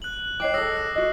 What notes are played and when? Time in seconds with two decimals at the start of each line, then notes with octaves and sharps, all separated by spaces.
0.02 F#6 F#7
0.40 C#5 D#5 G5 D6 C7
0.54 G#4 A4 D#6 E6 A#6
0.77 F#6
0.95 F#4 D#5